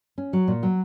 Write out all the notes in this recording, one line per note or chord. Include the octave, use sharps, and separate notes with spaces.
C#4
F#3
A#2
F#3